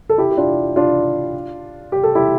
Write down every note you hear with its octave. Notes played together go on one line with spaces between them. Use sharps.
A4
E4 G4
G4
D4 F4
D4 F4
G4
A4
E4 G4